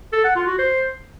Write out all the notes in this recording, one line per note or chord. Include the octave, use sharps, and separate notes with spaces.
A4
F#5
F4
F#4
C5